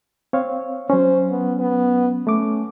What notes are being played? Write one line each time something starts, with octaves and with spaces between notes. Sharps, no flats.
C4 C#5 F5
F#3 C#4 C5
B3
B3
A3 C#4 D6